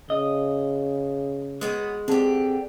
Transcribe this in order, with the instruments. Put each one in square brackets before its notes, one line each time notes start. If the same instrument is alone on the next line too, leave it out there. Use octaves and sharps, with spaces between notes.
[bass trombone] C#3 [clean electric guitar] D#5
[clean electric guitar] G#3 [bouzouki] B3 F#4 C#5
[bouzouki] D3 G4 [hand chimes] C4 G#4 A5